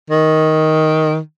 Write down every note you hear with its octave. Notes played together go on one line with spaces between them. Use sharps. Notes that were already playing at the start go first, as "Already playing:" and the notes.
D#3